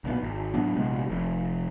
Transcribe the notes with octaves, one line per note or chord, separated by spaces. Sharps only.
B1 A#2 C#3 B3
G#1
A2 F#3 B3 D4
A#1 C3 G#3 B3
F1 F2